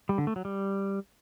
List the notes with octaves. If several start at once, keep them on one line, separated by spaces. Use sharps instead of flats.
G3
D3
A3
F#3
G3